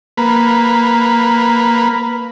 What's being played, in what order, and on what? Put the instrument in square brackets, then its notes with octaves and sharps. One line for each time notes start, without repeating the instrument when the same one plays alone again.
[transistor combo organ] A#3 B4